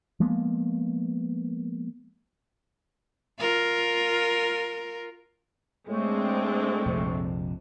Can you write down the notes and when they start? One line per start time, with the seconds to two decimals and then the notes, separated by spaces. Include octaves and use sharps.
0.20 F3 G#3 A#3 B3
3.38 F4 A#4
5.88 A2 G#3 A3 C4 D4
6.86 A#1 F2 C3